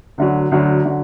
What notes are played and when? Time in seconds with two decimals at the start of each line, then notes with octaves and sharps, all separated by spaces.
0.18 D2 D3 F#3
0.51 D2 D3 F#3
0.85 D3 F#3